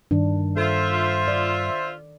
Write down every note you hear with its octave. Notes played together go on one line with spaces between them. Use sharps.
G2 D#3 D4
F4 A4 C5 E5
D5